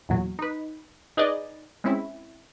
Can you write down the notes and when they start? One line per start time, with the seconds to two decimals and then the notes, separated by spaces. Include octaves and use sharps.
0.09 E2 A#2 F#3
0.39 D#4 B4
1.17 D#4 G#4 B4 D5 D#5
1.84 G#3 C4 C#4 E4